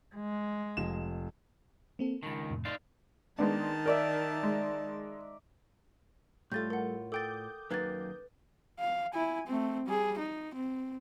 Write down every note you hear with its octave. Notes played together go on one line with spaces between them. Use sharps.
G#3
F1 F3 E7
A#3 C4 A4
C#2 D#3 A5 B5
F2 A2 C3
D#4 D5 F5 B5 C6 F#6
D#3 G#3 B3 D4 A5
D#4 A#4 D5 E5
G#3
A2 G3 A3 F4 A4 G6 A6
A#4 F#5
A4 G5 D6 D#6 G6 A6
F#2 D#3 A#3 B4 G#6 A6
F5
E4 G#5
A3 C4
G3 G#4
D#4
C4